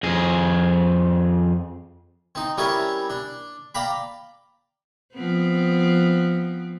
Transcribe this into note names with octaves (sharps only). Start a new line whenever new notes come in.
F2 G#4
C4 D#4
G3 C4 C#4 E4 A#4
D4
D5 F5 G5 A#5 B5
F3 B3 C4